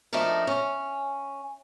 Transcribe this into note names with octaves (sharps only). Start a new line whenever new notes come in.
F3 A3 D4 D#4 A#4
C#4